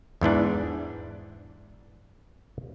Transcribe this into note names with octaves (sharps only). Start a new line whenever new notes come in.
E2 G#2 E3 D4